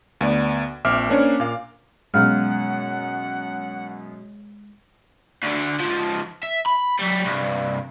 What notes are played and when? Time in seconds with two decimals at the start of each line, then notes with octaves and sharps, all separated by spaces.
0.21 D2 B3 D5
0.85 A#1 C4 E5 D6 F6
1.09 A#3 C#4 D4 C5 C#5
1.40 A#2 F5
2.14 F#2 B2 G#3 F5 F#5 F6
5.43 D2 D3
5.80 G#2 F3
6.43 E5
6.66 B5
6.99 F#3 G3
7.26 C2 G2